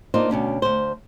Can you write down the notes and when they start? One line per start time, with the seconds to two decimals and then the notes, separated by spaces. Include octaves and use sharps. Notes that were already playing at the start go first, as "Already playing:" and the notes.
0.14 A#3 D4 D#4 F4 C5
0.30 D2 B2 C#4 D4
0.62 D2 C5